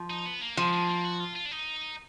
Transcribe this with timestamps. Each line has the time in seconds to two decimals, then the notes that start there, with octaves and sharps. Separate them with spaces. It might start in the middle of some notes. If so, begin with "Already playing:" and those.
Already playing: F3
0.10 D#4
0.26 B3
0.41 A#3
0.57 F3 G#3
0.73 G#3
0.89 A#3
1.04 F#4
1.20 F4
1.36 F4
1.46 D4
1.51 D#4